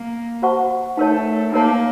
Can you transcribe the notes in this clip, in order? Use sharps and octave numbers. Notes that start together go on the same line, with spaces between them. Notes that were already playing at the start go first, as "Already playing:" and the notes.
Already playing: A#3
F#4 C5 F#5 A5 C#6
A3 D#4 A#4 C#5 A5
A#3 D#4 A#4 C#5 A5